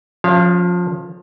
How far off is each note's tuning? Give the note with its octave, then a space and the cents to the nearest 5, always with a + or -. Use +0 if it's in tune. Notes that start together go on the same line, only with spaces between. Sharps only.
F3 +25 C#4 +0 F5 -25